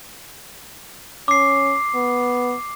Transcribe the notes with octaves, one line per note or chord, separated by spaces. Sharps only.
C#4 D6 C7
B3